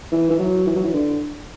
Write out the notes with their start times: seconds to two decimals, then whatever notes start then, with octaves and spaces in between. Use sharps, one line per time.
0.12 E3
0.30 E3
0.39 F#3
0.66 E3
0.76 F#3
0.84 E3
0.93 D3